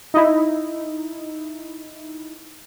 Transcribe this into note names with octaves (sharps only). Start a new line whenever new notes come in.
D#4 E4